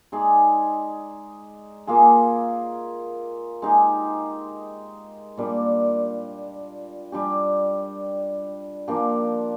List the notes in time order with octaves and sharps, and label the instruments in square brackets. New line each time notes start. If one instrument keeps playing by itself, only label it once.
[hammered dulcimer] G#3 D#4 G#4 D5
A#3 F4 G#4
G#3 D#4 G4
A#2 G3 D4
G3 D4 G4
F3 A#3 D4 G4